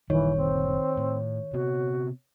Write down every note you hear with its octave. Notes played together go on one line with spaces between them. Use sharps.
F#1 A#2 D#3 E3 G3 C#5
C4
A2
C3 B3 C4 F#4